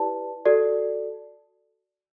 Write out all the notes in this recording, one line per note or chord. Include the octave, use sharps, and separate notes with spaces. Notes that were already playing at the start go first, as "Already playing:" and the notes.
Already playing: E4 G4 B4 D5 A5
F#4 A4 D5